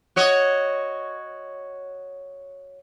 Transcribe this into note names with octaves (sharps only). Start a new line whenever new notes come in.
F#4 C#5 D#5